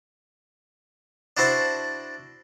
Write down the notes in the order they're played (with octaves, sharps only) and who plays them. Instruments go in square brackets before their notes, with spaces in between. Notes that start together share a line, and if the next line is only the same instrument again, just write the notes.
[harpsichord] D4 E4 F#4 C5 E5 A5